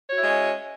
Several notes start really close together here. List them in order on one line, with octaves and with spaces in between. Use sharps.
C#5 F#4 E4 G#3 C#4